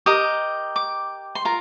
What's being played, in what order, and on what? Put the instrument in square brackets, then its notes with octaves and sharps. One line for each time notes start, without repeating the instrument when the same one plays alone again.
[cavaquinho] G4 A#4 D#5 D#6
D6
C6
F4 A#4 A#5